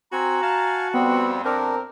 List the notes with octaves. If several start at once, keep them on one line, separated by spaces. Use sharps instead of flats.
C4 F#4 G#5 A#5
F5 G#5 A5
F2 G3 B3 C4
C4 D4 A#4